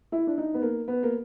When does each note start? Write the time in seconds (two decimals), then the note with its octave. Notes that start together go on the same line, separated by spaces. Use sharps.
0.12 E4
0.27 D4
0.38 D#4
0.54 B3
0.62 A#3
0.88 B3
1.03 A#3